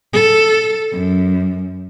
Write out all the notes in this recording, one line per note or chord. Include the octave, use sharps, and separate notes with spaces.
A4
F#2